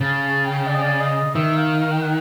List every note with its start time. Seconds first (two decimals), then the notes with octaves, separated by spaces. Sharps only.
0.01 C#3 A5
0.23 A5
0.45 G5
0.68 D5
0.75 D#5
0.82 D5
1.01 D#5
1.35 D#3 E5
1.56 F5
1.80 F5
1.92 G5
2.02 F#5